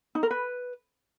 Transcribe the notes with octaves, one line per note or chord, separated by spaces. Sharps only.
D#4
A#4
B4